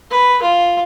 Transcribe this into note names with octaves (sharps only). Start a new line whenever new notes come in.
B4
F4